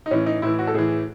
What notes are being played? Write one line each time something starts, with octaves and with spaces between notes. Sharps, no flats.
D#4
A2 E3 C#4
D#4
A2 E3 E4
F#4
A4
A2 E3 G#4